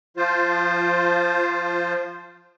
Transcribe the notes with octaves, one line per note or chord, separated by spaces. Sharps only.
F3 F4 C5